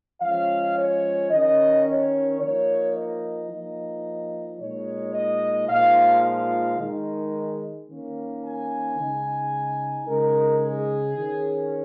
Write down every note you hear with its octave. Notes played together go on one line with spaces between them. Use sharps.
F3 G#3 C#4 F5
C#5
D#3 C#4 D#5
C#5
F3 A#3 D#4 C#5
D#5
F3 A#3 D#4
A#2 G#3 D#4 C#5
D#5
A#2 F3 G#3 D#4 F5
F5
D#3 G#3 D#4
D#3 A#3 C#4
G#5
C#3 G#3 D#4
C#3 G#3 D#4 A#4
G#4
D#3 C#4